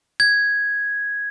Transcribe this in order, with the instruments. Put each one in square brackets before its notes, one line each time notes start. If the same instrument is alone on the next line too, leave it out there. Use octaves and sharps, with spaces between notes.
[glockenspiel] G#6